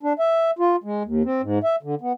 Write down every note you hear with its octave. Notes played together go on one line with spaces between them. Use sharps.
D4
E5
F4
G#3
D#2
C4
G#2
E5
D3
B3